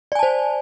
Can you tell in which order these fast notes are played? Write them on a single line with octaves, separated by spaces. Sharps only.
D5 G#5 A5 C5